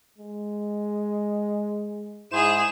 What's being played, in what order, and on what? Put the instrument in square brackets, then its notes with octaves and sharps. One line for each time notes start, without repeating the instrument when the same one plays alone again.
[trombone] G#3
[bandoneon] G#2 C5 [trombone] E4 [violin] G#4 E7